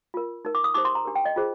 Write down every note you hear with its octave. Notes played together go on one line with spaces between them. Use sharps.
F4 A#4
D#4 A#4
D6
D#6
D#4 G4 C5 D6
C6
A#5
D4 G4 A#4
G5
D#5
F4 G#4 C5